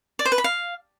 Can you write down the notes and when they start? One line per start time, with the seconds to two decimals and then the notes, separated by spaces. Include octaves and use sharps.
0.19 D5
0.25 C5
0.32 B4
0.38 B5
0.44 F5